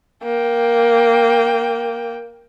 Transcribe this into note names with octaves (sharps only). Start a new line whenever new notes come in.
A#3 G5